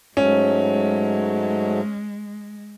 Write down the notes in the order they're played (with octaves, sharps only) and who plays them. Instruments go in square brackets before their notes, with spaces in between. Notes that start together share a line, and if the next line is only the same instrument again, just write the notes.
[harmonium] G#2 F#3 A3 [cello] G#3 [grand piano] C#4